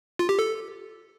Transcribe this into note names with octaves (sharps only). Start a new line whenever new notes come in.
F4
G4
A4